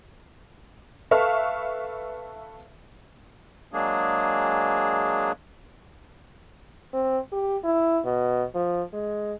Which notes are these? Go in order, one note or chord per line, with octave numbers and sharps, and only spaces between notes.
A4 B4 E5 F5 C#6 F6
F#3 G#3 A#3 D4 G#4
C4
G4
E4
B2
F3
G#3